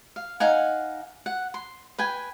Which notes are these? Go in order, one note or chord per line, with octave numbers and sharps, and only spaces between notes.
F5
D#4 F5 F#5 G#5
F#5
C6
B4 G5 G#5